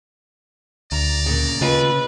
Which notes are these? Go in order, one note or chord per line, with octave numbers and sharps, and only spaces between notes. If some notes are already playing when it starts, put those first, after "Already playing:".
D2 D5 A#5
A#2 C#3
D#2 C#3 F4 B4 D#5